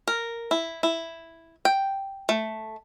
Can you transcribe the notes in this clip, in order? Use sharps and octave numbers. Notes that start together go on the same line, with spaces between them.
A#4
E4
E4
G5
A3